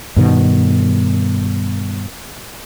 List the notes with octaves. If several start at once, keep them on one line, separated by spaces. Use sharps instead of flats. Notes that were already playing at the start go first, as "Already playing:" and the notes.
G2 B2 D#3